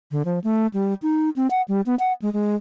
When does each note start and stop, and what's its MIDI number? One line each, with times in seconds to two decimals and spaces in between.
0.11 0.23 50
0.25 0.39 53
0.44 0.67 57
0.74 0.94 55
1.02 1.30 63
1.36 1.47 60
1.51 1.62 78
1.68 1.81 55
1.86 1.95 59
1.99 2.13 78
2.22 2.32 56
2.33 2.55 56